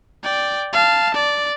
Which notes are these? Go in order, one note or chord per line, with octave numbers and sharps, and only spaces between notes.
D5 G5
F5 A5
D5